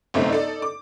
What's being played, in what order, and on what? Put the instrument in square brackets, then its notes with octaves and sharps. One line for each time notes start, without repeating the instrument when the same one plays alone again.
[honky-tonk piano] G1 F#2 C3 A3 C4 D#4
D#4 A4 D5
D6